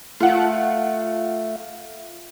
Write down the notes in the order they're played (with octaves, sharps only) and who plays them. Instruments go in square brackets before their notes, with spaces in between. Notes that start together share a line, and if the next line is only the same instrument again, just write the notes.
[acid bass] A3 [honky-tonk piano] F4 F#5